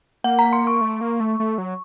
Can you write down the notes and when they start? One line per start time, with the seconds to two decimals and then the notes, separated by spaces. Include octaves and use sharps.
0.24 A#3 F#5
0.39 A#5
0.53 C6
0.67 C#6
0.81 A3
1.01 A#3
1.20 A3
1.40 A3
1.58 F#3